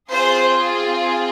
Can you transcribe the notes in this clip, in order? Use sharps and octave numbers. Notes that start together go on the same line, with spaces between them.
C4 F4 G#4 C5